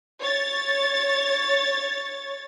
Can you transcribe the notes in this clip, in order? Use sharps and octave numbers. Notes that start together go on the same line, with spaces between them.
C#5 A6